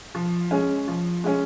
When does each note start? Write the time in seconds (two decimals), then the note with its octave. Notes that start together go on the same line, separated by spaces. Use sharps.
0.15 F3
0.51 G#3 C#4
0.88 F3
1.24 G#3 C#4